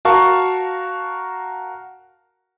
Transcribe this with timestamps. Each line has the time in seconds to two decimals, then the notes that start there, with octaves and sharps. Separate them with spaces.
0.05 F#4 A#4 F5 A5 C#6